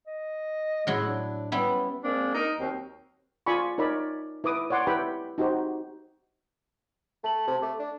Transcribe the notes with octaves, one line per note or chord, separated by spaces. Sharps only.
D#5
A2 F#3 G#3 E4
D4
G3 B3 C#4 E4
G#3 A#3 C4 D4
D#4 A#4
D#2 F#3 C4
F4 D5 G#5 B5 C#6
D#4 A#4 C#5 D5 B5
E4 B4 D6 D#6
C#5 D5 F#5 C6 D6
E4 G4 B4 G5 B5
D#4 F#4 G4 C5
A3 A5 F#7
C3
A3 D6
D4